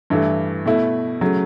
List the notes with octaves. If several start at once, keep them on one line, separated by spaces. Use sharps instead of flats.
G2 E3 A3 E4
B2 A3 E4
C#3 F#3 A3